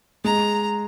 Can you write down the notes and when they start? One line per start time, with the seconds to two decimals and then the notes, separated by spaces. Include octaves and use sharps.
0.24 G#3 A#5